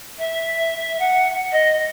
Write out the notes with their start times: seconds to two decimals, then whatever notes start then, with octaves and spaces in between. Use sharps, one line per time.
0.19 E5
0.99 F#5
1.52 D#5